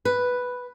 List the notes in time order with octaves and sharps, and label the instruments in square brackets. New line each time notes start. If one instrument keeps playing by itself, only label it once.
[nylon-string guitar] B4